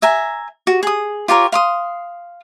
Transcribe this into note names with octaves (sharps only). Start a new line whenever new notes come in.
E5 G#5 A#5
F#4
G#4 D#6
F4 G4 A#4 C#5
F5 C6 D#6